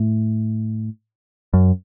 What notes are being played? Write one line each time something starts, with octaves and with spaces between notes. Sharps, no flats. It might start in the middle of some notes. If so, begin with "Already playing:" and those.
Already playing: A2
F#2